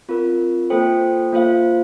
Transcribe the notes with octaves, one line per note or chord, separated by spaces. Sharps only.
C4 F4 A#4
A#3 F4 A4 C5 G5
A#3 F4 C5 F5